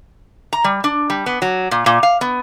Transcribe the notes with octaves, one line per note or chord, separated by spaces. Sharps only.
A#5
G3
D4
G3
B3
F#3
A#2
A#2
F5
B3